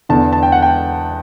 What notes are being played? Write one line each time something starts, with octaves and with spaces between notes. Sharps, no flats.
E2 D3 A5
A5
G5
F#5
G5